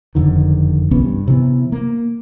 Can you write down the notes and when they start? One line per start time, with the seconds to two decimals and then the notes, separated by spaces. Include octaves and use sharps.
0.15 F#1 F2 D3 D#3
0.91 C2 E3 B3 C#4
1.04 G2
1.28 C3 E3 B3
1.72 A#3